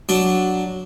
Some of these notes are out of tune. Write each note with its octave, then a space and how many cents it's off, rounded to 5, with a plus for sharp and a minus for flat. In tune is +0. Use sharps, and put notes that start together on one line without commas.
F#3 +0 D4 +0